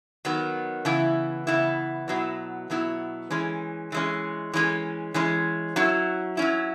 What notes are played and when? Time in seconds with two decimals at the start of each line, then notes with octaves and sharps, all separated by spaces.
0.25 D#3 F#3 B3
0.85 C#3 E3 B3 E4
1.47 C#3 E3 B3 E4
2.08 B2 F#3 B3 E4
2.70 B2 F#3 B3 E4
3.30 E3 G#3 C#4
3.92 E3 G#3 C#4
4.54 E3 G#3 C#4
5.14 E3 G#3 C#4
5.76 F#3 C#4 E4
6.37 F#3 C#4 E4